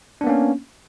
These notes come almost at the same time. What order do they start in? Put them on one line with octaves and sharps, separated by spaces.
D4 B3 A#3 C#4